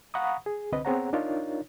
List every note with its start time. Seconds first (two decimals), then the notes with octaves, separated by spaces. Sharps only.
0.14 F5 F#5 A#5 B5 C#6 D#6
0.46 G#4
0.72 C2 D3 C4 B4 D#5
0.85 B3 C4 G#4 C#5 F#5 A#5
1.13 D4 D#4 F4 A#4 C#5